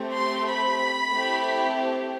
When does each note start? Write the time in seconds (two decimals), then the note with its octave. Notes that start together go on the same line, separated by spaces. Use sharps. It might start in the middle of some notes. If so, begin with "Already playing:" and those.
Already playing: A3 C4 G4
0.15 C6
0.49 B5
1.13 A3 C4 E4 G4